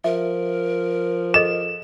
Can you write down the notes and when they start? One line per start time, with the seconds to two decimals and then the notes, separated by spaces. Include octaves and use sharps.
0.04 F3 A#4 E5
1.34 G#4 A4 D#5 E7